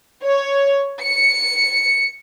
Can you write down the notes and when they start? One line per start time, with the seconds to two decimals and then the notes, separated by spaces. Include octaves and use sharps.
0.23 C#5
1.00 C#7